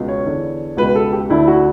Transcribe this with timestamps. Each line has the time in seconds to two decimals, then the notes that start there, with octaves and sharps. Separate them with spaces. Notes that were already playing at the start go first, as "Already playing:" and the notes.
Already playing: C#2 B2
0.08 C#5
0.26 E2 D3
0.77 C#2 B2 B4
0.95 A4
1.13 G4
1.30 D2 D3 E4
1.48 F#4